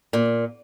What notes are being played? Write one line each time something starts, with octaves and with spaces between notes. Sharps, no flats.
A#2